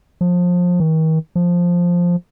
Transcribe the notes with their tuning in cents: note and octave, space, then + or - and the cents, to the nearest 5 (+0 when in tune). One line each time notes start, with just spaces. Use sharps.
F3 +25
D#3 +40
F3 +5